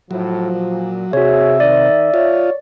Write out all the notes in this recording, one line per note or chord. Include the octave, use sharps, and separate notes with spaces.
A2 F3 F#3
A#2
C3 F#4 G#4 C#5 E5
D#3 D5
F4 C#5